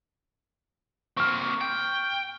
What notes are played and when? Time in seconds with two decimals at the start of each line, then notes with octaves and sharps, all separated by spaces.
1.17 A#3 C4 C#6 F6
1.61 G5